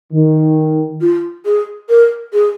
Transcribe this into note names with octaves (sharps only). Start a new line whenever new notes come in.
D#3
F4
G#4
A#4
G#4